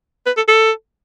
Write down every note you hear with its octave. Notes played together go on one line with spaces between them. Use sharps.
B4
A4
A4